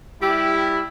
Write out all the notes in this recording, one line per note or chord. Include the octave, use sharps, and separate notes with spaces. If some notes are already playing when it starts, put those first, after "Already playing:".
G3 E4 G4